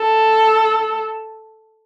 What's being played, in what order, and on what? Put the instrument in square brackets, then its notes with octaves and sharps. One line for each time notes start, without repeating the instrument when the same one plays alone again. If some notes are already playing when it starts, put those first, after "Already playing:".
Already playing: [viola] A4